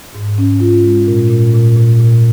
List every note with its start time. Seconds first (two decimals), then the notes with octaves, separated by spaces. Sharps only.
0.15 G#2
0.38 C#4
0.60 F4
0.84 G#3
1.08 A#2
1.30 A#2
1.54 A#2
1.76 A#2
2.00 A#2